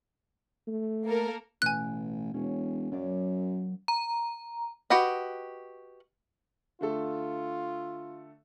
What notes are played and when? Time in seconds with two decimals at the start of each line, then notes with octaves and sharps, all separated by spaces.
0.68 A3
1.06 A#3 A4 A#4
1.62 A1 B2 G#5 F#6 D7
2.34 E1 C#4
2.92 F#2 F#3 A#3 D5
3.88 A#5
4.90 F#4 G4 B4 D#5
6.81 D3 A3 F4 A4